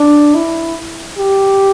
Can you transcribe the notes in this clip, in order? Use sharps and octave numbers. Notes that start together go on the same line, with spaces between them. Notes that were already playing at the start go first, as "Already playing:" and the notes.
Already playing: D4
E4
G4